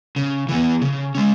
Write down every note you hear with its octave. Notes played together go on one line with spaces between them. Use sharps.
C#3
E3 B3
C#3
G#3 C#4